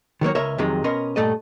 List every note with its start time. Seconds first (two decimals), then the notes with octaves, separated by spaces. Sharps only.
0.21 D#3 F#3 A#3 C#5
0.35 C#2 A#4 C#5 D#5 E5
0.58 F2 C3 D#3 F#3 G#3
0.84 B2 C#4 A#4 D#5 C6
1.16 G2 A#2 A3 A4 D#5